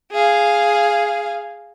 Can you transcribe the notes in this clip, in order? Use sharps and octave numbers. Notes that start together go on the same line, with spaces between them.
G#4 F5